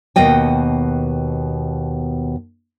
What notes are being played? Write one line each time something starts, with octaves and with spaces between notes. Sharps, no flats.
D#2 B2 B3 D#5 G5